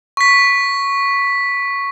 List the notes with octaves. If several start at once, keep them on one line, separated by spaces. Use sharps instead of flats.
C#6 B6